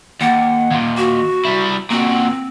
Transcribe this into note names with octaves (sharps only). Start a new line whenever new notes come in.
D#2 F#5
D#2 A#2
F#4
G3 E4
A#2 C4 F#4